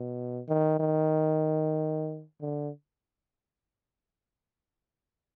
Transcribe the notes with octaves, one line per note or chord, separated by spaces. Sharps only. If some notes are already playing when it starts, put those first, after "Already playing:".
Already playing: B2
D#3
D#3
D3